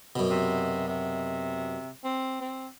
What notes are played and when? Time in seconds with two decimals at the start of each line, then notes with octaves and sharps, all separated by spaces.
0.16 F#2 B2
0.30 C3
0.88 C3
2.04 C4
2.41 C4